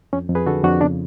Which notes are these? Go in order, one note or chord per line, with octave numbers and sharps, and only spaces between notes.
F2 C#4
F2
G#4 B4
D3 F#4 A4
F2 D4 F#4
C#3 B3 D4